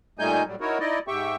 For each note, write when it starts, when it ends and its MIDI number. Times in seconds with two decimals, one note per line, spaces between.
0.19 0.43 46
0.19 0.43 55
0.19 0.43 57
0.19 0.43 63
0.19 0.43 80
0.19 0.43 91
0.46 0.56 45
0.46 0.56 54
0.46 0.56 55
0.61 0.78 63
0.61 0.78 64
0.61 0.78 66
0.61 0.78 70
0.61 0.78 73
0.80 0.99 63
0.80 0.99 64
0.80 0.99 74
0.80 0.99 75
1.08 1.36 44
1.08 1.36 67
1.08 1.36 76
1.08 1.36 79
1.08 1.36 85